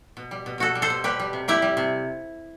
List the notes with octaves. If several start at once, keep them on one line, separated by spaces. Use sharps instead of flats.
B2
G3
B2
B2 F#4 A4
G3
A4 C5
B2
G3 G4 B4
G3
C3
G3 E4 G4
G3
C3